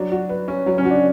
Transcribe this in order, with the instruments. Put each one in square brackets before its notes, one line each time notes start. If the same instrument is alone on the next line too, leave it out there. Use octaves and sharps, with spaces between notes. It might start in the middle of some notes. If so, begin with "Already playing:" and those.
Already playing: [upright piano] F#3 [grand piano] D4
[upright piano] F#4
B4
C#4
F#3
[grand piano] C#4
[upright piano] F#4
[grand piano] D4